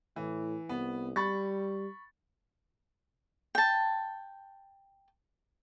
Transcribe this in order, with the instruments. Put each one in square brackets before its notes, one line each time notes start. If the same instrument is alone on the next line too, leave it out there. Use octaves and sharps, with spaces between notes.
[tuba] A2 [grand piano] E3
[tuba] C2 [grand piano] B3
[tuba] G3 [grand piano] B5 C#6 A6
[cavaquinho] G5 A5